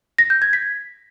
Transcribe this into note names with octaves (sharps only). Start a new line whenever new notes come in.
A#6
G6
G#6
B6